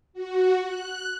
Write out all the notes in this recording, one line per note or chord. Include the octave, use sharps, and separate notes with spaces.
F#4
F#6